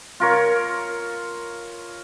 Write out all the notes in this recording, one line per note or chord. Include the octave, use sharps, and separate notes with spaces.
F4 A#4 C#5